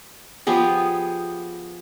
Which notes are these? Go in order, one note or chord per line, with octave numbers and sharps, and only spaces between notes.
F3 B3 G4 G#4